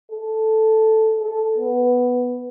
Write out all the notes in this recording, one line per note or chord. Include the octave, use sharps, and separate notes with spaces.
A4
A4
B3